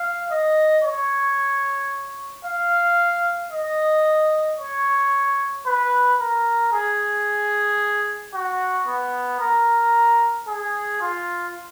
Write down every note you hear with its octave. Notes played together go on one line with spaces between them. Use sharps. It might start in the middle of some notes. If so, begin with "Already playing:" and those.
Already playing: F5
D#5
C#5
F5
D#5
C#5
B4
A#4
G#4
F#4
B3
A#4
G#4
F4